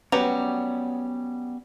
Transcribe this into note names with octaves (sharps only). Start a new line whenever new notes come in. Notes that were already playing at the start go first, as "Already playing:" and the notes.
F#3 G3 B3 C#4 B4 F7